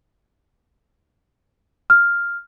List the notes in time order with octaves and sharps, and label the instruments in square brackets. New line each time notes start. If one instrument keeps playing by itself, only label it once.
[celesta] F6